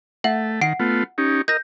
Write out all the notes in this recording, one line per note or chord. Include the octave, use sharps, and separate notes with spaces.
A3 E5 F#5 F#7
D#3 F#5 C7 D7
A3 B3 F4
C#4 D#4 G4
A#4 D#5 G6 A#6